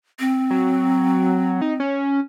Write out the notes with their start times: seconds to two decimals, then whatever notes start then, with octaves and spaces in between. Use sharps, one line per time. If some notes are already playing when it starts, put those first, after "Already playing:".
0.20 C4
0.50 F#3
1.61 D#4
1.80 C#4